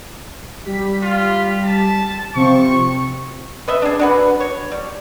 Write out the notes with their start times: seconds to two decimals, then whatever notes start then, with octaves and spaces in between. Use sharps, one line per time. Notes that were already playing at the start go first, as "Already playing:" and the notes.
0.65 G3 G4 B6
1.03 F4
1.64 A5
2.35 C3 F3 C4 C#6
3.68 B4 D#5 E5
3.82 D4 G#4
3.99 D4 F#4 B4
4.40 C#5
4.71 G3